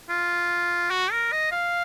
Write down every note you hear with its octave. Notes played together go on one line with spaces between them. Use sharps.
F4
F#4
A#4
D#5
F5